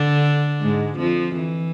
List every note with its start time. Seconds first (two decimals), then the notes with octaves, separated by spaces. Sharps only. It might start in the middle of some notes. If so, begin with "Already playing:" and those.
Already playing: D3 D4
0.61 G#2 G#3
0.98 F2 F3
1.35 E3